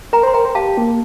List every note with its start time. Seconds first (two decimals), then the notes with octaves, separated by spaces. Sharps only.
0.13 A#4 G5 A#5
0.23 C5 C6
0.34 A#4 G5 A#5
0.45 C5
0.55 G4 F5 A5
0.78 A#3